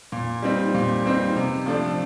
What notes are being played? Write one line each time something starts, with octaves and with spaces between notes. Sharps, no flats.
A#2
G3 C4 D#4
A#2
G3 C4 D#4
C3
F3 A3 D4